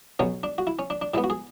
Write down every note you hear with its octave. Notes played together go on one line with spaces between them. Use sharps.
B1 B2 F#3 C#4
D4
F#4
E4
C#4
D4
D4
A2 G#3 B3 E4
F#4
G#4